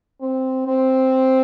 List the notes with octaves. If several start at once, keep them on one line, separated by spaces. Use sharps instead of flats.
C4
C4